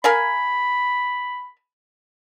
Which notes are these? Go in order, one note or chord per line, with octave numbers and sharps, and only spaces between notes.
A#4 F5 G#5 B5